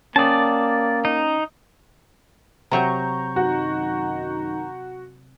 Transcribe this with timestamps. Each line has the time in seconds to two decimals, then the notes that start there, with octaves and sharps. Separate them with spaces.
0.16 A#3 C#4 D5 G5 A5 D#6
1.05 D#4
2.71 C3 F#3 A#5 C#6 G6
3.36 F#2 D#3 D#4 F#4